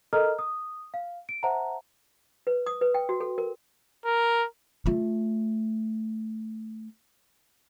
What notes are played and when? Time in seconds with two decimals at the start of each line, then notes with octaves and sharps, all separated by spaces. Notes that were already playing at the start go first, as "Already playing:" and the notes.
0.13 A4 A#4 D#5 A#5 F6
0.39 D#6
0.94 F5
1.29 D7
1.43 C5 E5 F#5 A5 A#5
2.47 B4
2.66 D#6
2.81 B4
2.94 G5
3.09 F#4
3.20 A4
3.38 A#4
4.05 A#4
4.86 A3 F4